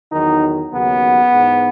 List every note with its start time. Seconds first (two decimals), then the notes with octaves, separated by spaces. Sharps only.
0.12 E2 D#3 F#3 D#4
0.72 D#2 C#3 F#3 B3
1.33 G#2 E3